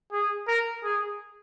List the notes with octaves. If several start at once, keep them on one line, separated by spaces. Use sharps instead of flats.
G#4
A#4
G#4